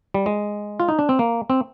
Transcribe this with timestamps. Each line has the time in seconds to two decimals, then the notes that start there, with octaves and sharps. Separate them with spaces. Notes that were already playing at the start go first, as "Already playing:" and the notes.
0.14 G3
0.26 G#3
0.80 F4
0.88 D#4
0.99 D4
1.09 C4
1.19 A#3
1.50 C4